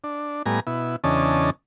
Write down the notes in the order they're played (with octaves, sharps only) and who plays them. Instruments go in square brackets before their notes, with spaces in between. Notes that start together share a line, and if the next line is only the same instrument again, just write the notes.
[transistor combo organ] D4
A2 G3 B3 G#5 A#5
B2 E4
E2 C#3 C#4 D4 D#5 A5